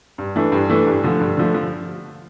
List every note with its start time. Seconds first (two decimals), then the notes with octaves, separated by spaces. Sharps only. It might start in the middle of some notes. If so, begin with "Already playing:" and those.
0.18 G2
0.36 E3 A3 D4
0.52 G2
0.69 E3 A3 D4
0.86 G2
1.04 D3 F3 A3
1.20 G2
1.37 D3 F3 A3
1.54 F3